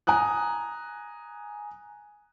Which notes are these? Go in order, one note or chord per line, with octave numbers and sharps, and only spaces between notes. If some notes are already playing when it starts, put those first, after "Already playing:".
G#5 A#5 D#6 F#6